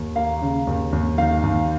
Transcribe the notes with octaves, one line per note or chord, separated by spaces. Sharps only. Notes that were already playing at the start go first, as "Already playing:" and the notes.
Already playing: D#2
A#3 F5
C#3
D#2
D#2
D#3 F5
D#2